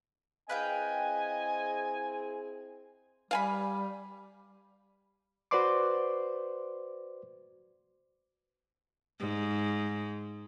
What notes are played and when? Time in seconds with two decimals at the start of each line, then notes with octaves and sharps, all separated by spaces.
0.50 C4 E4 G#4 B4 D#5 F5 G5 G#5
3.31 G3 F5 G#5 B5
5.51 F#4 B4 C5 D5 C6 D6
9.20 G#2